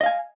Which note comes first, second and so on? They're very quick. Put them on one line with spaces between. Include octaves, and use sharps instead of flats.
D#5 F5 G#5